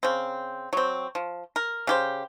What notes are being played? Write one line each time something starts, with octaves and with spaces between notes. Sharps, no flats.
C#3 C4
F#3 C4
F3
A#4
C#3 G4 C5